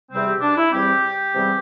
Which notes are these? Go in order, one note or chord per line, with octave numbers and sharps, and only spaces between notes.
E2 C3 G3 C4
G4
D4
E4
E2 C3 G3 C4 G4
E2 C3 G3 C4